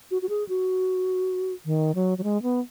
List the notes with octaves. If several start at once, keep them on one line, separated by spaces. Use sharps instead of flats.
F#4
F#4
G#4
F#4
D#3
F#3
F#3
G#3
B3